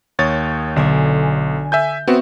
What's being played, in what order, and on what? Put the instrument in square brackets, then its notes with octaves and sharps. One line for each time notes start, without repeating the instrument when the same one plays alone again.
[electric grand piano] D#2 C#5 A6 [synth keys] D#6 G6
[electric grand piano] B1 [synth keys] D3 A4 G#5
[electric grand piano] E5 G#5 G6
[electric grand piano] B3 C4 F#4 [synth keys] E5 C#6